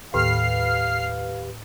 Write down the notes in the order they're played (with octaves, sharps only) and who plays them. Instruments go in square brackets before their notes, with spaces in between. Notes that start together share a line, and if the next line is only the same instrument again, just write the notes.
[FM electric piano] D#2 G4 B4 [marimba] A2 [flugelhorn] F5 [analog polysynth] F6 C7